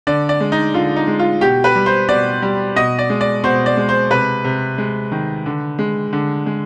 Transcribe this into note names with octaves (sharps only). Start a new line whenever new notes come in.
D3 D5
D5
G#3
D#4
D3 F4
D#4
G#3
F4
B2 G4
B4
G3
C5
B2 D5
G3
B2 D#5
D5
G#3
D5
B2 C5
D5
G#3
C5
C3 B4
C3
G#3
D#3
D3
G#3
D3
G#3